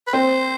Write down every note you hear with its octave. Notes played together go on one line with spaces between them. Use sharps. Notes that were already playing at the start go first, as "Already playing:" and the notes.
B4
C4 C5